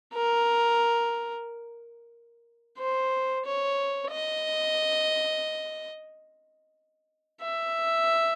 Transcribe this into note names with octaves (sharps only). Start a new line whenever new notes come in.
A#4
C5
C#5
D#5
E5